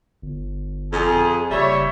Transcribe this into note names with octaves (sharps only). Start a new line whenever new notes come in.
G1
F2 G#4
F#1 G3 C#5 E5